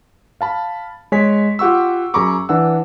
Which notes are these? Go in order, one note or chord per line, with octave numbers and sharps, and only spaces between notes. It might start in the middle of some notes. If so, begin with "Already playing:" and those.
F5 A5 B5
G#3 C#5 G#5 B6
F4 G4 F#5 C#6 E6
F#2 G#4 A#5 B5 C#6 D6
E3 D4 F#5 E6